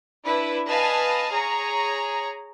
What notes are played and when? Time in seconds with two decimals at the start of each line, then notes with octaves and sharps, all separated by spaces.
0.24 D4 E4 B4
0.68 B4 D#5 F5 G#5 A5
1.33 G#4 C#5 A#5